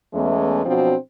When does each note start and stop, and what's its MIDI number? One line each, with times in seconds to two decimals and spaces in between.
0.14 0.63 40
0.14 0.63 52
0.14 0.63 56
0.14 0.63 57
0.14 0.63 59
0.14 0.63 61
0.66 0.94 47
0.66 0.94 53
0.66 0.94 54
0.66 0.94 60
0.66 0.94 62
0.66 0.94 66